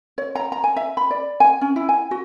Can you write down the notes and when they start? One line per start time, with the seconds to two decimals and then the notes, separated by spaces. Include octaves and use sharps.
0.18 C#5
0.35 A#5
0.52 A#5
0.64 G#5
0.76 E5
0.97 B5
1.11 D5
1.40 G#5
1.61 C#4
1.76 E4
1.89 G#5
2.11 F#4